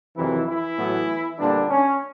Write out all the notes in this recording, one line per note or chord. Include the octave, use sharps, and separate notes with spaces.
F2 C3 D#3 E3 F#3 E4
E3 E4
A2 F#3 B3
A#2 D3 G3 B3 D4
C#4